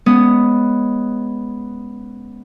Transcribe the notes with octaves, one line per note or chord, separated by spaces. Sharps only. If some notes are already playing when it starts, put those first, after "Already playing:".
G#3 B3 C#4 D#6